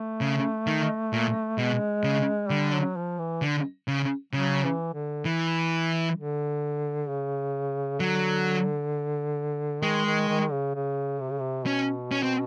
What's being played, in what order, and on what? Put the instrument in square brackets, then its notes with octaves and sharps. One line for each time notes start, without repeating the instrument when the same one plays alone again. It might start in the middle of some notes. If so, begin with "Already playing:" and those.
Already playing: [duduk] A3
[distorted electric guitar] C#3
D#3
A#2
[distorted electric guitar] B2 [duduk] G#3
[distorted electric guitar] C#3
[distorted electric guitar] D3 [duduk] G3
[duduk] F#3
F3
E3
[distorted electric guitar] D3
C#3
[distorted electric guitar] C#3 [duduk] F#3
[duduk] E3
D3
[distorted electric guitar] E3
[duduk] D3
C#3
[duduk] D3 [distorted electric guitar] F#3
[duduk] D#3 [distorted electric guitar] G#3
[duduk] D#3
D#3
C#3
C#3
C3
C#3
C3
[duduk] B2 [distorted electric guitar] C#4
[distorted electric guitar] C#4
C4